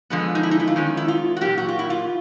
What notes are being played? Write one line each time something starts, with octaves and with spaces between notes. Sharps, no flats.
D3 F3 G#3 B3
D#4
E4
D#4
E4
F4
D#3 G#3 C#4
E4
F4
F#4
A#2 F#3 A#3 G4
F#4
F4
E4
F4